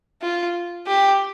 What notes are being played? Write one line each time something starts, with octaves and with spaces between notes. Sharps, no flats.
F4
G4